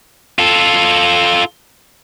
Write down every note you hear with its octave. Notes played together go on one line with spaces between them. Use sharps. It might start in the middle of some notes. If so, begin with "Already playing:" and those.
F4 A4